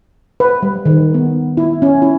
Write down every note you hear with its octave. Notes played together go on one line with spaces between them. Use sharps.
B4
G3
D#3
B3
E4
C#4
E4